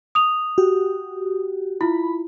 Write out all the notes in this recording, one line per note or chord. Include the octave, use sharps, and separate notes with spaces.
D#6 F7
F#4 G4
E4 F4 B5